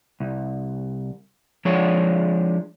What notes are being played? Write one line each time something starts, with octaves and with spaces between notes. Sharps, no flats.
C2
F3 G#3 D4 C#5